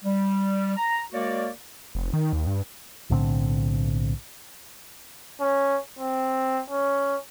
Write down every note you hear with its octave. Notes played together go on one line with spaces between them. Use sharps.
G3
A#5
G#3 A#3 F#4 A#4 C#5 D5
F1
D#3
D#2
G2
B1 A2 D3 C4
C#4
C4
C#4